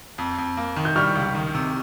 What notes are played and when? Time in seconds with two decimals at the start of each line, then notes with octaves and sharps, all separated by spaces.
0.18 F2
0.38 F2
0.57 A#3
0.76 D#3
0.85 G6
0.96 G3 C#6 F6
1.15 C#2
1.35 D#3
1.55 C3